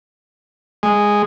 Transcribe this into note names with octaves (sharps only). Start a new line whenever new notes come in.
G#3